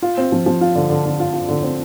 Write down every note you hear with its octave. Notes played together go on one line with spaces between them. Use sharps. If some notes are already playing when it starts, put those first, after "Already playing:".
F4
C4
F3
F3
F4
D3
D3
D3
F4
F4
D3
C4